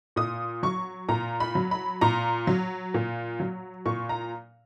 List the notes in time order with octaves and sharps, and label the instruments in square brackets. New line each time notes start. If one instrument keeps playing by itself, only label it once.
[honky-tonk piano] A#2 D#6
F#3 C#6
A#2 A#5
B5
F#3
B5
A#2 A#5
F#3
A#2
F#3
A#2 C#6
A#5